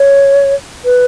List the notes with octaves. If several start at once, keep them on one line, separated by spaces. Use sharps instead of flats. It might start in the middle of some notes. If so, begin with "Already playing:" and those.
Already playing: C#5
B4